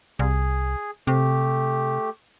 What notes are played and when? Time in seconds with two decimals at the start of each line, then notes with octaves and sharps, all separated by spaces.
0.19 C2 G#4
1.07 C3 A3 G4